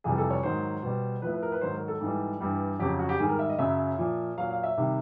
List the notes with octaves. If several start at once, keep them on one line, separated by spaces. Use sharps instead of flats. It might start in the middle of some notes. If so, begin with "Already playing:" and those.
F2 C3 E3 G3 G#4
A4
C#5
G#2 D#3 F#3 C5
B2 G3
A2 F3 B4
B4
A#4
B4
G#2 D#3 F#3 C5
A#4
A4
G#2 E3 G3
G2 E3 G3
F2 C#3 F#3 G4
F#4
G4
G#2 D#3 G3 G#4
A#4
E5
D#5
F#2 C#3 F#3 E5
A#2 F3
A#2 F#3 F5
F5
E5
C3 D#3 G3